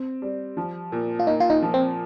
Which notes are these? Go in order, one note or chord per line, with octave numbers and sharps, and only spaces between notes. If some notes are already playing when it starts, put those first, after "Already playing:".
Already playing: C4
G3
F3
A#2
F4
A#3 D#4
F4
D#4
F3
C4